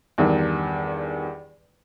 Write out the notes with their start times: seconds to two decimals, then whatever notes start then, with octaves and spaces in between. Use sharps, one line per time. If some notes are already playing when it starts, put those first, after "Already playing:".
0.18 E2 G2 D#3